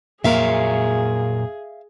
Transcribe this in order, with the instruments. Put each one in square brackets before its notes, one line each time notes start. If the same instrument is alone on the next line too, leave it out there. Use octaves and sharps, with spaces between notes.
[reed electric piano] F2 A#3 [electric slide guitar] A#2 F#3 A#4 [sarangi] G#4 [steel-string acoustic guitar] E5 F5